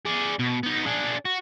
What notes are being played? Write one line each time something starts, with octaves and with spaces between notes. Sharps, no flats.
G#4 D5
B2
B3 D#4
D4 G#4
F#4